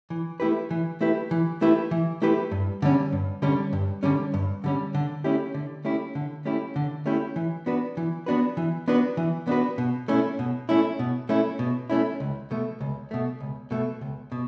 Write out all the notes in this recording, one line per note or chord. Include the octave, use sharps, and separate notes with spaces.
E3
A3 E4 G4 B4
E3
A3 E4 G4 B4
E3
A3 E4 G4 B4
E3
A3 E4 G4 B4
G2
D3 G3 C#4
G2
D3 G3 C#4
G2
D3 G3 C#4
G2
D3 G3 C#4
D3
A3 C#4 E4 G4
D3
A3 C#4 E4 G4
D3
A3 C#4 E4 G4
D3
A3 C#4 E4 G4
E3
B3 D4 F#4 B4
E3
B3 D4 F#4 B4
E3
B3 D4 F#4 B4
E3
B3 D4 F#4 B4
B2
A3 C#4 E4
B2
A3 C#4 E4
B2
A3 C#4 E4
B2
A3 C#4 E4
C#2
B2 A3
C#2
B2 A3
C#2
B2 A3
C#2
B2